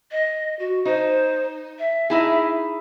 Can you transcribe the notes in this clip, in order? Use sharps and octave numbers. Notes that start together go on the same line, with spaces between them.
D#5
F#4
D#4 C5
E5
D#4 E4 G#4